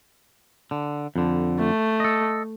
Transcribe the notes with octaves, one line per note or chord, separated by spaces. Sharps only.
D3
F2 D3
A3
A4 D#5